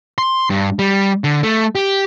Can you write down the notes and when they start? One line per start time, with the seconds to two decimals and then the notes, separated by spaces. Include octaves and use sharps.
0.18 C6
0.50 G2
0.79 G3
1.24 D3
1.43 A3
1.75 G4